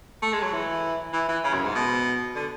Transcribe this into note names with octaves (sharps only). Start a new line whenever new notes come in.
A3
G#3
F#3
E3
E3
E3
C#3
F#2
G#2
B2
D3